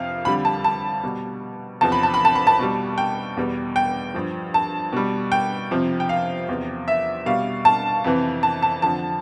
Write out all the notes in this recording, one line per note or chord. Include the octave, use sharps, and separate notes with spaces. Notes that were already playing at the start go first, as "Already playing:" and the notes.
Already playing: F2 C3 F3 F5
F2 D3 G3 B5
A5
A5
B2 G3
E2 C3 F3 A5
B5
A5
B5
A5
B5
A5
B2 G3
G5
E2 B2 G3
G5
G2 F3
A5
B2 G3
G5
F2 C3 F3
G5
F5
E2 C3 F3
E5
B2 G3 F5
A5
F2 C3 E3
A5
A5
F2 D3 F3 A5